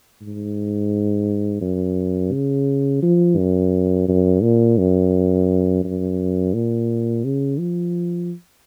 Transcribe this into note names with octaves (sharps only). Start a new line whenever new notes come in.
G#2
F#2
C#3
F3
F#2
F#2
A#2
F#2
F#2
A#2
C#3
F3